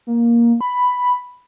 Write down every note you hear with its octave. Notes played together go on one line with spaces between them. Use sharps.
A#3
B5